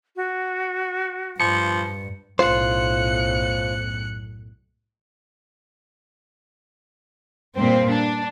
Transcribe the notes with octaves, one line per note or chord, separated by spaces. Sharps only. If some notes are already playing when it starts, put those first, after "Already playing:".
F#4
G2 F3 C#7
B1 F#2 A2 F4 C5 F#6 C#7
G2 A#2 C4
D4